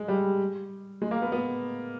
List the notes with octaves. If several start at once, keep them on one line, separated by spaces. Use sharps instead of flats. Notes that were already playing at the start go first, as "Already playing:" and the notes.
Already playing: G#3
G3
G#3
A#3
B3
B3